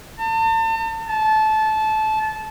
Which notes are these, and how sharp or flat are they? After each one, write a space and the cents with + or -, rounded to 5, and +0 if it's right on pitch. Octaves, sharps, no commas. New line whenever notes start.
A5 +40
A5 -20